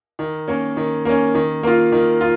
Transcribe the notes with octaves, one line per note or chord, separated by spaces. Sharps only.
D#3
A#3 C#4
D#3
A#3 C#4
D#3
A#3 F4
D#3
F4